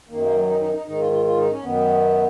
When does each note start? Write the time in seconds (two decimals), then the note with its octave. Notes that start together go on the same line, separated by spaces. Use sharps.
0.09 F#2 D#3 A#3
0.22 A#3
0.35 F#3
0.48 D#4
0.61 D#4
0.74 D#4
0.87 G#2 D#3 D#4
0.99 F4
1.12 F4
1.25 F4
1.37 D#4
1.51 C#4
1.63 F#2 D#3 B3